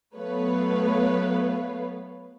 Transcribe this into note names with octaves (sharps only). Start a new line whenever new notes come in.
F#3 A3 B3 B4 C#5 F5